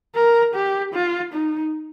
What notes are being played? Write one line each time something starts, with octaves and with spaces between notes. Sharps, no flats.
A#4
G4
F4
D#4